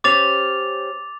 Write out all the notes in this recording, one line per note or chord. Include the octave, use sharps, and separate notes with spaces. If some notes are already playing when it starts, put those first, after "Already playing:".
C#4 G4 C5 D6 A6 F7